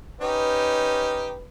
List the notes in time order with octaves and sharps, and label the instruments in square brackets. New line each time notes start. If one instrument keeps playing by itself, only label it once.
[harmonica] C#4 D#4 G4 [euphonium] B4